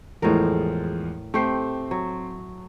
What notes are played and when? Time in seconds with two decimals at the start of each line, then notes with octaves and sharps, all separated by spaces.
0.22 E2 A2 F3 G#3 A#4
1.34 A3 C4 G4 C7
1.91 F#3